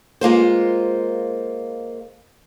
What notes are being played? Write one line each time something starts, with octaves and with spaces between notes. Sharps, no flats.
G#3 A#3 F4 C5